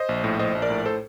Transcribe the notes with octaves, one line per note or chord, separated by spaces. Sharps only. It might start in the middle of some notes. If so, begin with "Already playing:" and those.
Already playing: C5 D#5
A#1
A2
A#1 C5 D#5
A#1
A#4 D5
A2
A4 C5